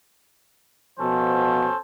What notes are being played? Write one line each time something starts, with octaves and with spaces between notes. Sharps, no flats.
B2 F3 C#4 A4 C5